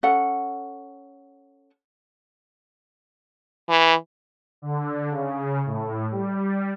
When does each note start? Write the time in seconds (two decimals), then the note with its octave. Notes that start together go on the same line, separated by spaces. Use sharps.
0.03 C#4 A4 F#5
3.69 E3
4.62 D3
5.10 C#3
5.66 A2
6.11 G3